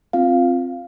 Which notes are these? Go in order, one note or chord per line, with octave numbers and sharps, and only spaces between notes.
C4 F4 F5